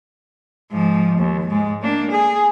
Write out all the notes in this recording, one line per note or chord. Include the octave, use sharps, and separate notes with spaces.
G#2 F3
D#2
G#2 G#3
A#3 D4
G#4